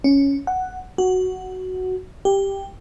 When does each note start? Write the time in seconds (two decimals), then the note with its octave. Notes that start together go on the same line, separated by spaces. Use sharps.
0.04 C#4
0.47 F#5
0.98 F#4
2.25 G4